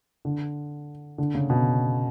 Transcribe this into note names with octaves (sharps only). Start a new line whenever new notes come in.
D3
D3
C#3
B2